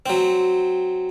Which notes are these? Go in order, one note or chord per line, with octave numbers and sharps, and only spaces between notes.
F#3 C4